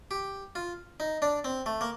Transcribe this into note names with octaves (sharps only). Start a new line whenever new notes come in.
G4
F4
D#4
D4
C4
A3
A#3